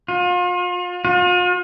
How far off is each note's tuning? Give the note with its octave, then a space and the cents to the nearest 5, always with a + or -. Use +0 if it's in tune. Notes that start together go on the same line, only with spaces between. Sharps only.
F4 +35
F4 +40